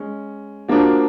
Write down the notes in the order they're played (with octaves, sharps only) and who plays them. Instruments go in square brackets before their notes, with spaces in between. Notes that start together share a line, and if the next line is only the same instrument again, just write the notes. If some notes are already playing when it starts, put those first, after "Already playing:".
Already playing: [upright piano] G#3 C#4
F3 A#3 D4 F#4